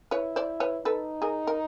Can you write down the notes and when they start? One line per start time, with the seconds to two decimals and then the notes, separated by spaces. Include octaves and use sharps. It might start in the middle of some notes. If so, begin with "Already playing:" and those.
0.11 E4 B4 C#5
0.36 C5 D5
0.60 B4 C#5
0.85 D#4 A4 B4
1.22 G#4 A#4
1.47 A#4